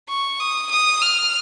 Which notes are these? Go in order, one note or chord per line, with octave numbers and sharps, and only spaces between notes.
C#6
D#6
D#6
F6